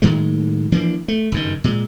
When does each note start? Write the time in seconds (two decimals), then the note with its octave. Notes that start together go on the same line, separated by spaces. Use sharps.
0.02 A2 D#3 F#3 G#3
0.72 E3 F3 A#3 D4
1.08 A3
1.32 F#1 G2 D#3
1.64 A#2 G#3